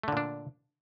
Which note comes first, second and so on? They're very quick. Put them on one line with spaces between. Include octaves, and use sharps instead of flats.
A3 D3 A#2 D4